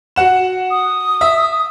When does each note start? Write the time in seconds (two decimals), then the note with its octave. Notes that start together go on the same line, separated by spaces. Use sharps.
0.16 F#4 F#5 E7
0.71 D#6
1.21 E5